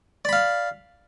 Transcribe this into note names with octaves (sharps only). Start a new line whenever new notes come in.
D5 F5 B5